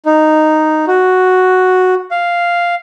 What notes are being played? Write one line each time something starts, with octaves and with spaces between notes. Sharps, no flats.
D#4
F#4
F5